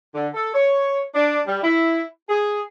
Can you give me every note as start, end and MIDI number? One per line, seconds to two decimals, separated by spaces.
0.14 0.27 50
0.33 0.54 69
0.54 1.02 73
1.15 1.39 62
1.46 1.59 55
1.63 2.03 64
2.28 2.61 68